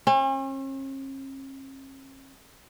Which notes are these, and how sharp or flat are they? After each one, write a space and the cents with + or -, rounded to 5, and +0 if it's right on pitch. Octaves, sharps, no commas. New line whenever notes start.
C#4 -45